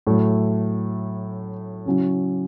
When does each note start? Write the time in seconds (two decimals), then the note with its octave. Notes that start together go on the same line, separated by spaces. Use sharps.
0.07 A2 F#3 A3
1.85 C#3 F#3 C#4 E4